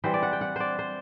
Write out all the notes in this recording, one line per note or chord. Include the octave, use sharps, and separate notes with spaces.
E3 G3 C4 C5
D5
F#5
G5
F#5
C5 D5
C5